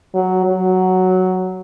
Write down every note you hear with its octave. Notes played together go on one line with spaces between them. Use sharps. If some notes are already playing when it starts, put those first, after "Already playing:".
F#3
F#3